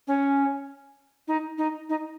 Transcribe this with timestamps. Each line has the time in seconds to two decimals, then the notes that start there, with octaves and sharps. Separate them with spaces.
0.07 C#4
1.27 D#4
1.58 D#4
1.89 D#4